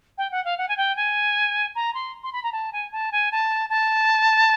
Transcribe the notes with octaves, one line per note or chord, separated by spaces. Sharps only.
G5
F#5
F5
F#5
G#5
G5
G#5
A#5
C6
C6
B5
A#5
A5
G#5
A5
G#5
A5
A5